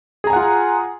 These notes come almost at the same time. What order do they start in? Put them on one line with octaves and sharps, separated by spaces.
G#4 A#5 G#5 F#5 F4